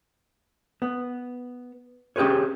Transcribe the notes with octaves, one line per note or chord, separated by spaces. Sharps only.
B3
C#4 G4 G#4 B4 C#5